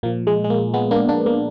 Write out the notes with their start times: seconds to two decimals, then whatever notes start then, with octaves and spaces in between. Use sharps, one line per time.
0.03 A#2 F3 A#3
0.27 G#3
0.44 G#3
0.50 A#3
0.74 G#3 B3
0.91 A#3 D4
1.08 A#3 D4
1.26 A#3